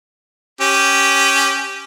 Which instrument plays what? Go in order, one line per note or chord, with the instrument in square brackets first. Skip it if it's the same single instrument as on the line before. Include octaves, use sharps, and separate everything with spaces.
[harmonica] C#4 G4